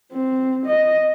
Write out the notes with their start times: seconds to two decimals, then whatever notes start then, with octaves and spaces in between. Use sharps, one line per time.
0.12 C4
0.66 D#5